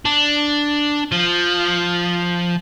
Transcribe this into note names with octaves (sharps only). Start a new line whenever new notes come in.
D4
F3